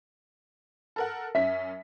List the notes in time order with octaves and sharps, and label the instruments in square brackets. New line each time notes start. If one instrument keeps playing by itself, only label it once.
[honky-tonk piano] A4 A#4 F#5
[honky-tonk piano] F#2 C#4 B6 [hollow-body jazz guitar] E5